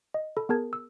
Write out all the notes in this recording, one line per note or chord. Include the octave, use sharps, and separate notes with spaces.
D#5
A4 B5
B3 G#4 A#4 A5 G#6
E6